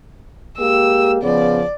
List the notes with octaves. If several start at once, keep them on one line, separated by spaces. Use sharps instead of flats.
G#3 A#3 G4 E6
C#3 F3 B3 D5